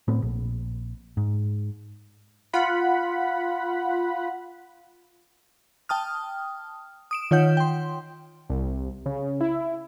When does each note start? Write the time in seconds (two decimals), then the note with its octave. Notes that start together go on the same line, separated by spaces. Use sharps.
0.08 A2 B3 C4
0.22 A#1
1.17 G#2
2.53 F4 F#5 B5
5.89 G5 A5 D#6 F6
7.11 D#6 D7 E7
7.31 D#3 F4 C#5 F#5 G6
7.57 G5 C6
8.50 C2
9.06 C#3
9.41 E4